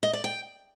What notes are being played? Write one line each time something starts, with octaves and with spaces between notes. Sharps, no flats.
D#5
D5
G5